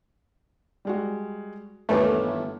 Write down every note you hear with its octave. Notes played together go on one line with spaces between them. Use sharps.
G3 G#3 F#4
G1 D#2 E3 A3 C#4 D6